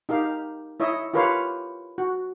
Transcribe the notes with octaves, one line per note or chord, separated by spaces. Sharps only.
D#4 G4 A#4 F5
E4 C#5 D#5 E5
F4 G4 A#4 B4 C#5 F5
F#4